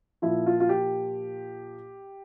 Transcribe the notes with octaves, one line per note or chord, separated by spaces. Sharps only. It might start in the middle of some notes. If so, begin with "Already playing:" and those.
A#2 F3 E4
F4
F4
G4